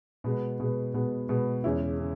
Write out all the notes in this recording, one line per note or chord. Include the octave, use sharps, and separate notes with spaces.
B2 G#3 B3
B2 G#3 B3
B2 G#3 B3
B2 G#3 B3
E2 C#3 G#3 C#4 E4
C#3